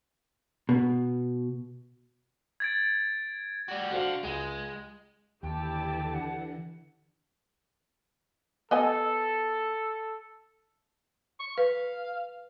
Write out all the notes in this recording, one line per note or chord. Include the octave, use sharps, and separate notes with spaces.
B2
G#6 A6 D7
G3 F#4
D3 F#4 C5 F5
C#2 G#3
D#2 D3 E3 E4 G4 G5 A5
F#5
B3 A4 D#5 G#5
C#6
B4 F5